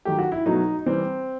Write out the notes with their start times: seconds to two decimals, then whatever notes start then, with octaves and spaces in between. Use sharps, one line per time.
0.05 D#3 F#3 A3 G4
0.19 F#4
0.32 E4
0.46 B2 F#3 A3 D#4
0.86 C3 E3 G3 C4